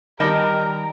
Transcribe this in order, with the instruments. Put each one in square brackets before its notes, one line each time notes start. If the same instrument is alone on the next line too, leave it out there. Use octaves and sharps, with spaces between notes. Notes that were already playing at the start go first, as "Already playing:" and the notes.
[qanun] D#3 G4 [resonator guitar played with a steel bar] G3 D#5 A5 [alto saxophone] A#4 [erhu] A#5